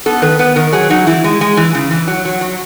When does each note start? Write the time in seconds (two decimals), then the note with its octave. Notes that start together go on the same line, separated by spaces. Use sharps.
0.06 B3 A4
0.22 D#3 B4
0.39 B3 B4
0.56 D#3 A#4
0.73 F#3 G#4
0.90 F#3 D#4
1.07 E3 E4
1.24 G#3
1.41 G#3
1.57 E3
1.75 C#3
1.91 E3
2.08 F#3
2.25 F#3
2.41 F#3